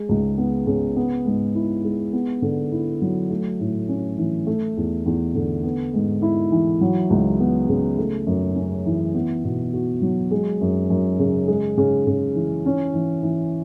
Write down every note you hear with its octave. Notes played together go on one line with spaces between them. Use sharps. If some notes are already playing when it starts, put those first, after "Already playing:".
Already playing: G#3
C#2
B3
C#3
B3
G#2
E4
G#3
B3
D3
E4
F#3
A3
A2
C#4
E3
A3
E2
E2
D3
B3
G#2
E4
E3
F#3
C#2
B3
C#3
A3
F#2
C#4
E3
B3
B2
F#4
F#3
G#3
F#2
F#2
C#3
G#3
C#3
C#3
E3
C#4
E3
E3